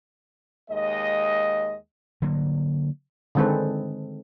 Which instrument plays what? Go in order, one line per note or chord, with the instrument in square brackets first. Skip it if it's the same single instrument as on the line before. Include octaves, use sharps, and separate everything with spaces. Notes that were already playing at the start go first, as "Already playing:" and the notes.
[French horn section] D#2 G#3 D#5
[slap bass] D3 F#3 A#3
[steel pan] D3 D#3 G#3 C4 A4 B4